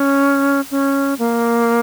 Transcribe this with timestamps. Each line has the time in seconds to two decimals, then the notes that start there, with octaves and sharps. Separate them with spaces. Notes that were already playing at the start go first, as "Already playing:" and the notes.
Already playing: C#4
0.71 C#4
1.19 A#3